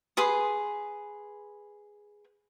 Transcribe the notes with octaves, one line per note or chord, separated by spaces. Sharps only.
G#4 B4 C6 D#6